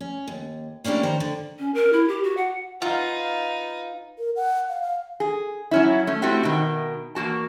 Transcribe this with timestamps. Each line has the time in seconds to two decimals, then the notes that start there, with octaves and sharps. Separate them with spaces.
0.01 C#4
0.28 D#2
0.84 A#3 C#4 D4 E4 G4
1.03 D#3 C5 A#5
1.20 D3
1.59 C#4
1.74 A#4
1.93 E4
2.08 G4
2.23 F#4
2.37 F#5
2.82 D#4 F4 B4 F5 F#5
4.19 A#4
4.36 F#5
4.69 F5
4.82 F5
5.20 G#4
5.71 F#3 C#4 E4
6.07 A3 C#4
6.22 A3 C4 E4 F#4 G4
6.43 B2 D#3
7.15 E2 A#3 F#4 A5